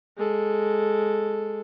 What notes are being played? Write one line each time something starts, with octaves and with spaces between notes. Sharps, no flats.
G#3 A4